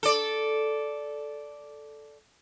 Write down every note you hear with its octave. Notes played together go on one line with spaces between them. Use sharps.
A4 D5